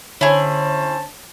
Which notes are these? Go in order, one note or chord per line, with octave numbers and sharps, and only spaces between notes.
D3 C#4 E4 G#4 C5 C#5 A5